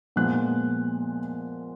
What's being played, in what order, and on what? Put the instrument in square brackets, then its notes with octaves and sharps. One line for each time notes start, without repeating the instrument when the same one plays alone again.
[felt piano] A#2 F3 G#3 B3 F#6